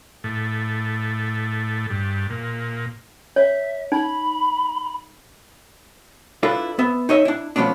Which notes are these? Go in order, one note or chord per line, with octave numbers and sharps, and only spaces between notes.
A2
G2
A#2
C#5 E5
D#4 B5
D4 E4 F4 A4 B4
B3 E5
D#4 C#5 D#5 E5
D4 E4
F3 A3 B3 C#4 D4